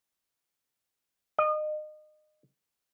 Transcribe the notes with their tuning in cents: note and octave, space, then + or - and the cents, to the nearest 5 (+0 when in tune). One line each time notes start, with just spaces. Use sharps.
D#5 -30